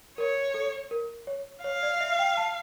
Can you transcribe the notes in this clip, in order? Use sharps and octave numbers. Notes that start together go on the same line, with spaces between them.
A#4 C#5
A4
A#4
C#5
C#5 F5
D5
E5
G5
A5